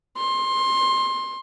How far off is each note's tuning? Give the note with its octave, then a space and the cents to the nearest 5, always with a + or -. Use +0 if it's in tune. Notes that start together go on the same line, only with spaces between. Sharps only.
C6 +20